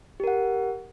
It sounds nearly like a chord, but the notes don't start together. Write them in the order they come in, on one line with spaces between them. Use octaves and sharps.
G4 A#4 F#5